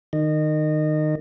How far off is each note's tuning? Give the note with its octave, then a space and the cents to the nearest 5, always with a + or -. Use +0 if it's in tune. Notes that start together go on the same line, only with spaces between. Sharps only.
D#3 -20 D#5 -25